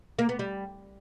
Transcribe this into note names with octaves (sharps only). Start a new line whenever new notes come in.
A#3
B3
G3